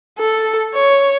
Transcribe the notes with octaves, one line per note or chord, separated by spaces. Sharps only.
A4
C#5